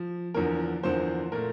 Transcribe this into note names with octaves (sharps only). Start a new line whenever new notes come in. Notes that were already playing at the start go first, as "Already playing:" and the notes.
Already playing: F3
E2 D3 F3 A#3 A#4
E2 D3 F3 A#3 C5
A#2 A3 A#4